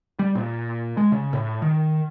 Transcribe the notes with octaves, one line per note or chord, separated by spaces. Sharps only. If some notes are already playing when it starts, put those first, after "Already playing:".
G3
A#2
G#3
C#3
A2
D#3